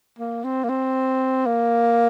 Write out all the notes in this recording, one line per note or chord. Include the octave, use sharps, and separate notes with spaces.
A#3
C4
A#3
C4
A#3